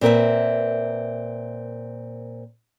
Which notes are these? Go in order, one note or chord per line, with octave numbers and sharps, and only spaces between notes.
A#2 C4 A#4 B4 E5